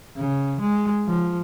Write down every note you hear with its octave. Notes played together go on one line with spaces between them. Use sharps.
C#3
G#3
F3